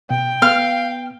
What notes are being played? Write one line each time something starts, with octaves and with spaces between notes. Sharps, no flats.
B2 G5
B3 F5 F6